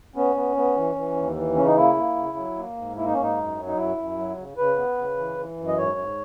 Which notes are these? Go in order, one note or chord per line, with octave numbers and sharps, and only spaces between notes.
B3 C#4
B3
B3
E3
E3
D#2
E3
C#3 C#4
D#4
A#3 E4
A#3
C#3
F#3
A#3
G#2
A#3 E4
D#4
C#4
G#2
D#4
F#2
F#3
D#4
F#2 E4
F#2
F#3
C#3
C#3 B4
B3
C#3
E3
E3
F#2
D#5
G#2 C#5
G#2